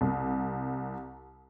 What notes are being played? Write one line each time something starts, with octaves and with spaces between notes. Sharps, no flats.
C2